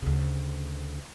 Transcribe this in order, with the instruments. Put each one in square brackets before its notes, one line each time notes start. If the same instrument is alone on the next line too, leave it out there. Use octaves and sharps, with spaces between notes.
[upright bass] D2 C#3